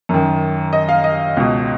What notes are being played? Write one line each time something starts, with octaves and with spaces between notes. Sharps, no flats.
F#2 D#3
D#5
F5
D#5
C#2 B2